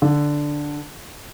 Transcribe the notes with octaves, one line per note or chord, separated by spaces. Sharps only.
D3